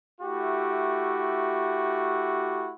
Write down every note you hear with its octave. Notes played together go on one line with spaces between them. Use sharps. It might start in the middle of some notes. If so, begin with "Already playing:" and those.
A3 E4 F#4 G4